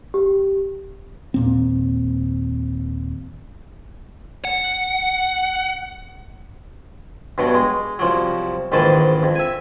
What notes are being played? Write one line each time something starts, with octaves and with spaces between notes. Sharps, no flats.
G4
D#2 A#2 C4
F#5
G2 B2 F#3
G#3
C2 F3 F#3
A#1 G#2 D#3 E3 A5
F2
E5 G#5